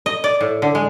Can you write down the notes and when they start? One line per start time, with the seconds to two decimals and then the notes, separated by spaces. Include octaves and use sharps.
0.06 D#5
0.24 D5
0.41 A2
0.62 D3
0.75 G#3